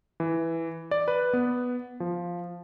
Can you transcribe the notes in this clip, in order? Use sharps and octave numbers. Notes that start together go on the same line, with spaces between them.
E3
D5
B4
B3
F3